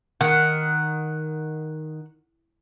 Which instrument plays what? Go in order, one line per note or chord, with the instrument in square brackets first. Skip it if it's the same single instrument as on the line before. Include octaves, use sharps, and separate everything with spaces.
[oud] D#3 [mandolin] F#5